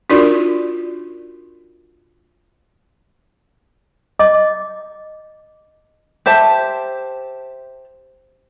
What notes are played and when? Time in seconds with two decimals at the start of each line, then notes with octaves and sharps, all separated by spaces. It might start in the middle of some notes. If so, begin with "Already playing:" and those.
0.10 D4 D#4 F4 F#4 A#4 D5
4.19 D#5 D6
6.26 G4 C5 E5 A5